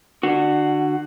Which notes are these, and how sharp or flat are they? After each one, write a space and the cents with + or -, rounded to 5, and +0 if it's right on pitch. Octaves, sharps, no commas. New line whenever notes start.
D3 +30 F#4 +0